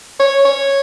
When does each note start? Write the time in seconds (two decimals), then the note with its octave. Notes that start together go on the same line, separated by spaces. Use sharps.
0.20 C#5
0.45 C#5